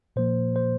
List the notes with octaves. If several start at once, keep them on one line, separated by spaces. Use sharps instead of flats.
A#2 F3 A#3 C5
C5